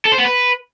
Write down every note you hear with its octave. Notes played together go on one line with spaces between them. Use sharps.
A4
C5
B3
B4